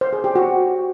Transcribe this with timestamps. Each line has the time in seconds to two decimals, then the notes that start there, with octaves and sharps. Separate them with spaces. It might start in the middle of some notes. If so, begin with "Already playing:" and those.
0.01 C5
0.13 G#4
0.24 G4
0.36 F#4